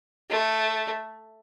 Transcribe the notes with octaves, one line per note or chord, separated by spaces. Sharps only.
A3